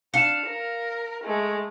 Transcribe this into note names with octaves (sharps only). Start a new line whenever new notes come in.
D4 F5 C#7 E7
A#4
G#3 A3